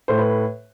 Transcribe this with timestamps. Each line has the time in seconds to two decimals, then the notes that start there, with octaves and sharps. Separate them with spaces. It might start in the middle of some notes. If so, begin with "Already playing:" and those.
0.08 A2 C5
0.18 B4